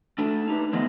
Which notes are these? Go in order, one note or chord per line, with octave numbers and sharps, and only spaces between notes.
A3 D4 A4
D#4 G4 B4
D3 F3 G#3 A3 B3 D#5